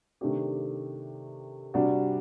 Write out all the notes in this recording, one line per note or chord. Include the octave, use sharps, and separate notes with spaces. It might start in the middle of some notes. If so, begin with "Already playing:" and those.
C3 D#3 A3 D4 G4
C3 G3 D4 F#4